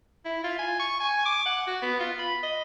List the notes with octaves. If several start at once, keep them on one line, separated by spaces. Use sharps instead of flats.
E4
F4
G#5
C#6
G#5
D6
F#5
F#4
B3
F4
B5
D#5